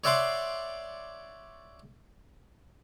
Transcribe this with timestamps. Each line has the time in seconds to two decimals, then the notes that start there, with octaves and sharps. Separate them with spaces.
0.04 C#5 D5 E5 F#5 C6 D6